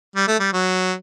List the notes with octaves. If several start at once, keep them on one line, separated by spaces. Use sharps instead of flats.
G3
A3
G3
F#3